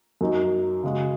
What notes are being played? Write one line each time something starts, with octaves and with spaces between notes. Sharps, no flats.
F#2 F#3 D#4
C#3 G#3 F#4